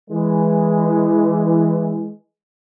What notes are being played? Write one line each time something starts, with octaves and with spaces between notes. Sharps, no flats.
E3 G#3